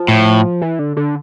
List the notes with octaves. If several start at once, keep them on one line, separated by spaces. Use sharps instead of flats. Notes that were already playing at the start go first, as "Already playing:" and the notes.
Already playing: F3
A2
E3
D3
D3